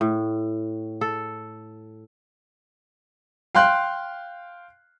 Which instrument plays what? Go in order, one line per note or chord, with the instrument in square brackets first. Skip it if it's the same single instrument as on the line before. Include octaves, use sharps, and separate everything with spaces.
[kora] A2
A4
[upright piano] F5 G5 C6 F#6